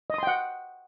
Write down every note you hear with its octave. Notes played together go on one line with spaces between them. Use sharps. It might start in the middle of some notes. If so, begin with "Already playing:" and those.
D#5 F#5 G5 C6 D#6